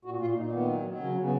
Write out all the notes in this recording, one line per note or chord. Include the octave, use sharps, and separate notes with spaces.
A#2 F#4
A#2 F4
A#2 D#4
D#3 B3
F#3
F#3
C#3 C#4
C#3
B3